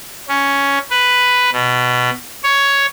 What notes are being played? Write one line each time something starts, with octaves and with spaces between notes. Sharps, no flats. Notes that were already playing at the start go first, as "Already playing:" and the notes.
C#4
B4
B2
C#5